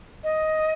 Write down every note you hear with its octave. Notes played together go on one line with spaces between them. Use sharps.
D#5